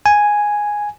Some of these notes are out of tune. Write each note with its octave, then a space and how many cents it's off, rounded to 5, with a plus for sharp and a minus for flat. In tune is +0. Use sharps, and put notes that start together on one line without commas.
G#5 +0